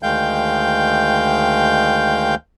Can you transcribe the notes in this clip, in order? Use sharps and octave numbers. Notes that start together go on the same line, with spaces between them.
D2 D#3 G#3 F5 G5 G6